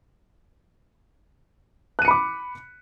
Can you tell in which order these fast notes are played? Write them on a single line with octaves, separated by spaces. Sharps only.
F#6 D#7 C#7 B5 D6